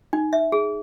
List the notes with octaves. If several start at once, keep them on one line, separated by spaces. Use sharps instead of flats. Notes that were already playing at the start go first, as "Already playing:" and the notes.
D#4
E5
G#4